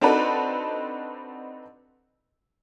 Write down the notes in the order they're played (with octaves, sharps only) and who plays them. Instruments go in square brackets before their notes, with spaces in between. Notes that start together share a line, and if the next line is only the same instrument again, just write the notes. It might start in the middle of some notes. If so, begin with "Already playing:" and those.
[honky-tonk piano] C4 D4 D#4 F#4 A4 B4